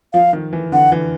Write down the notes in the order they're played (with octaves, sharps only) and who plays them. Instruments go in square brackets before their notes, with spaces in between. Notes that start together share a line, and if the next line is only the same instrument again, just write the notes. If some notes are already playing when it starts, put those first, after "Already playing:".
[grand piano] F3 [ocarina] F5
[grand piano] D#3
E3
[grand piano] D3 [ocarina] F#5
[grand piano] E3